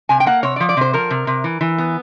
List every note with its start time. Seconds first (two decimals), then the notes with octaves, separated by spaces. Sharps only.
0.09 C3 G#5
0.20 G5
0.26 A#3 F#5
0.43 C3 C#5
0.56 D5
0.60 F3
0.69 D5
0.77 C3 C5
0.93 F3 A#4
1.10 C3
1.27 C3
1.44 E3
1.61 E3
1.78 B3